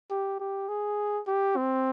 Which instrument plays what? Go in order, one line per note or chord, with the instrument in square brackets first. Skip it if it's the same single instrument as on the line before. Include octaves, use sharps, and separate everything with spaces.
[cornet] G4
G4
G#4
G4
C4